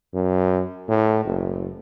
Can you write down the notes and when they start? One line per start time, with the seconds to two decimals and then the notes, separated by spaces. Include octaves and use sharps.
0.13 F#2
0.88 A2
1.25 F#1